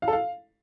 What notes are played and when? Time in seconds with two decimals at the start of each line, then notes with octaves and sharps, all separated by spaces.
0.02 F5
0.08 A4
0.13 F5